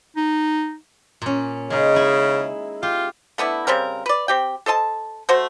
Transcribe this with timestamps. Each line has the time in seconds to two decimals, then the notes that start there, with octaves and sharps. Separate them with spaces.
0.17 D#4
1.22 A#2 C#4
1.70 C#3 G#3 D#4
1.95 D#4 E4
2.83 F4 G4
3.38 A3 B3 D4 E4
3.67 C#3 G3 C4 A#4
4.06 B4 D5
4.28 C4 G4 G5
4.66 A4 C5 D#5 A5
5.29 A3 F#4 C5